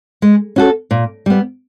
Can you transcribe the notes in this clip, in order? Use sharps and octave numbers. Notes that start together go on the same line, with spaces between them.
G#3
C#4 F#4 A4
A#2
G3 B3